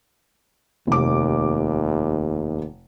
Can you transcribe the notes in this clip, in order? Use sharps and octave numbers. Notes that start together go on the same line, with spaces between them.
F1 D#2 D6